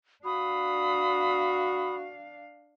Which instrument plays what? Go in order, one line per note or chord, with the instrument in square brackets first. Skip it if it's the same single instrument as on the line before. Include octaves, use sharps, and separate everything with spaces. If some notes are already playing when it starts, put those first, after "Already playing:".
[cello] D4 F5 [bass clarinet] F#4 [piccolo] B5 [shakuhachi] D#6